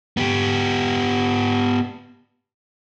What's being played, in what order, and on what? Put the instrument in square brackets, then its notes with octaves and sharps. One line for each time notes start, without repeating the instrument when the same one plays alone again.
[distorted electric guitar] B3 G4